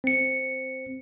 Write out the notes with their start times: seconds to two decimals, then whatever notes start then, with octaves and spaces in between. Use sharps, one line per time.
0.04 C4 C#7